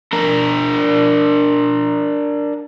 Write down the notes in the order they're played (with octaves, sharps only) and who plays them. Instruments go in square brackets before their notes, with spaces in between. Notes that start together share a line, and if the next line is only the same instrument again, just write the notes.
[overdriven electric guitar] D4 A#4